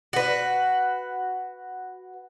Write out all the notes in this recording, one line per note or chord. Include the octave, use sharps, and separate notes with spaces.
F#4 B4